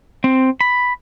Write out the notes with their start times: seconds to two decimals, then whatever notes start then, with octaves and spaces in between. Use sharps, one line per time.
0.24 C4
0.61 B5